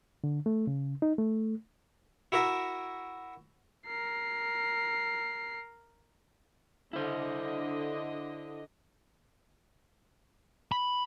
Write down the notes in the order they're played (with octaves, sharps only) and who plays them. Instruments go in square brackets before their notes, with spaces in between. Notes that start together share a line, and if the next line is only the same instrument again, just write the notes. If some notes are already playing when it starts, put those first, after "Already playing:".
[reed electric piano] D3
A3
C#3
D#4
A3
[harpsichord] E4 F#4 A#4 E5
[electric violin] A#4 C7
[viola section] D3 D#5 [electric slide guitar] E4 C5
[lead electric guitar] B5